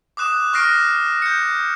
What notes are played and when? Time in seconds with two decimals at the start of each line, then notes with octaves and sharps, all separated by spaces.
0.17 D6 D#6 F#6 E7
0.53 C#6 F6 F#6 A#6 C7 D7
1.22 G6 C#7